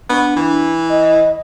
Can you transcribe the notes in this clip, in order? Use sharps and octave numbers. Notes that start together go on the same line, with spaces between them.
B3 D4
E3
D#5